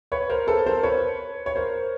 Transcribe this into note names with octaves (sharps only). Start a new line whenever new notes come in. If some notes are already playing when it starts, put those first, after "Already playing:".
B4 C#5
A#4 C5
A4 B4
A#4 C5
B4 C#5
C#5
A#4 C5